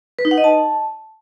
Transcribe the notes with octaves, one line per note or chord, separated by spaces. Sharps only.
B4
D#4
F#5
D#5
A5